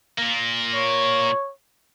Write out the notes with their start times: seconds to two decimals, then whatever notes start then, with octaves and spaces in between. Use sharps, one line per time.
0.18 A#2 A#3
0.74 C#5